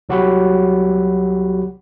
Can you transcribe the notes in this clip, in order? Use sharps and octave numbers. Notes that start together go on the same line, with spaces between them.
C2 F#3 F#4 G4 F#5 B5